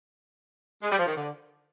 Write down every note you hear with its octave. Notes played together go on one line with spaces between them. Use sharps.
G#3
G3
F3
D#3
D3